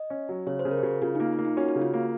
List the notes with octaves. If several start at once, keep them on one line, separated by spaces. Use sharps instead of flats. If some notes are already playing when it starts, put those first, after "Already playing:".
Already playing: D#5
C#4
F#3
C#3 C#5
C5
C#3
A#4
G#4
C#3 F#4
C#3 F4
D#4
A#3 F4
F4
A#3
D#4
C#4 F#4
F#4
C#3
F4
A#3